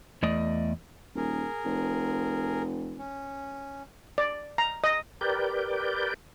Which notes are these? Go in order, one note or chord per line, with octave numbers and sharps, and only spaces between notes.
E2 A3 D5 D#5
D#1 G#4 A#4
F1
C#4
D5
A#5
D#5
G4 A#4 B4 D5 G6